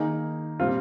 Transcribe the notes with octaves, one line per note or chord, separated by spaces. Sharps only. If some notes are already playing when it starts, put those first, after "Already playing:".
Already playing: D#3 A#3 D#4 G#4
A#2 G3 C4 F4